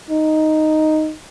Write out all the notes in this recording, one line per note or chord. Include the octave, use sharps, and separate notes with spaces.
D#4